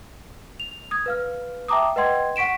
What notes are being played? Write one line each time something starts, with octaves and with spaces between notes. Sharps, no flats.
F7
D#6 G#6
B4 F5 F6
E5 G5 A5 A#5 D6 D#6
B4 D#5 F#5 G5 C6 G#6
F#5 C#6 B6 D7 E7